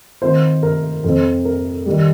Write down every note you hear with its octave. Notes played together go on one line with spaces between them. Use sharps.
D#3 C4 F4 C5
A#4
F2 F3 C4
A#4
D#3 G3